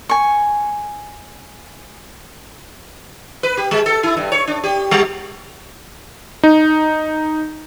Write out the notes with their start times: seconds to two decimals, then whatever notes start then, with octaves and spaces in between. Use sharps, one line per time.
0.09 G#5 C#6
3.43 B4
3.57 G4
3.71 G#3
3.86 A4
4.03 E4
4.17 G2
4.32 C#5
4.47 D4
4.64 G4
4.91 G3
6.43 D#4